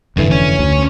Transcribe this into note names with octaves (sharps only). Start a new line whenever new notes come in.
F1 G2 D3 E3
C#4
D2